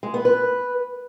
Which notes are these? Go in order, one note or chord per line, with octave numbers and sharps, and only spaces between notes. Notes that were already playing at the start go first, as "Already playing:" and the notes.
G#3
B3
B4